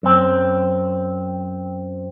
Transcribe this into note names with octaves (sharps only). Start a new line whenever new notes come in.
F#2 C4